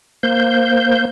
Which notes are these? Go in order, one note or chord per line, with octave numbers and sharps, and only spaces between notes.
A#3 C5 G6